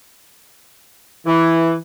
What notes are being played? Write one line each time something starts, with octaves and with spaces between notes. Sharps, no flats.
E3